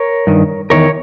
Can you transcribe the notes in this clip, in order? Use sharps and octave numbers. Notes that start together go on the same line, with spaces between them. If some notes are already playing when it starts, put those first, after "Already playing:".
Already playing: A#4 C#5
G2 D#3
E2 D#3 A#4 C#5